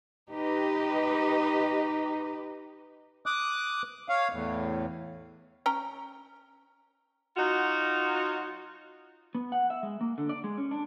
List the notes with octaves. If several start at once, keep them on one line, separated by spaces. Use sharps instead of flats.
D#4 G4 B4 D#5
D6 D#6 F#6
C#5 F5
E2 A2
C#4 G5 A#5
F#3 D#4 F4 F#4
B3
F#5
E5
G#3
A#3
D3
D5
G#3
C#4
D4